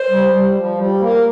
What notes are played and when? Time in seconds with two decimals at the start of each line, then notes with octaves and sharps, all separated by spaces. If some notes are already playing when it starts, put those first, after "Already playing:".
Already playing: C5
0.10 G3
0.32 G3
0.55 F3
0.78 G3
1.01 A#3